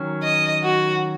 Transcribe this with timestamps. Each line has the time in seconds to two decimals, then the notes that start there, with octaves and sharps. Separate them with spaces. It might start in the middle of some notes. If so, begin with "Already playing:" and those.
Already playing: D#3 F#3 C#4
0.23 D#5
0.64 F#4